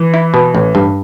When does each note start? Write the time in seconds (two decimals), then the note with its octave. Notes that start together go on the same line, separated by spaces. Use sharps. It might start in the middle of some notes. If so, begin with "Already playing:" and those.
Already playing: E3
0.14 E4
0.34 B2
0.55 A1
0.75 G2